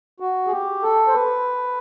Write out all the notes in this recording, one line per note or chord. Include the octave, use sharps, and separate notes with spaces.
F#4
G#4
G4
A4
C5
B4